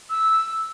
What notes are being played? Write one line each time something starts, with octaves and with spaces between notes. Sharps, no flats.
E6